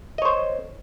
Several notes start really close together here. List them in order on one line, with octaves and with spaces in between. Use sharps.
D#5 C#5 C5